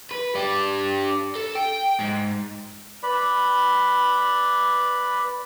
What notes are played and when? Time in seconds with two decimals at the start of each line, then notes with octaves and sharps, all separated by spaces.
0.11 B4
0.35 D4 G4
1.35 A4
1.55 G5
2.00 G#2
3.03 B4 D5 B5